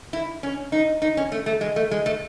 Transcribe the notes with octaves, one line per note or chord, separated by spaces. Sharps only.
E4
C#4
D#4
D#4
C#4
A3
A3
G#3
A3
G#3
A3